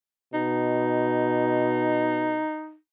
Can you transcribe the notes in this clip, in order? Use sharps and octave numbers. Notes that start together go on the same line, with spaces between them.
B2 D#4